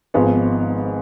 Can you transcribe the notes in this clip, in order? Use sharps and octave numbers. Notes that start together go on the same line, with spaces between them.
G#1 G#2 F3 G#3 B3